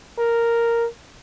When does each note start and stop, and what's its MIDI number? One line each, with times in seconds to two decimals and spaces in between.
0.19 0.85 70